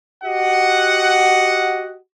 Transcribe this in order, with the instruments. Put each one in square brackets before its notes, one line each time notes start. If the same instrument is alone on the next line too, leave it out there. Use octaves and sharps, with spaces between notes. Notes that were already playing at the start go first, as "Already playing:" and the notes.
[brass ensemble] F#4 G4 D#5 F#5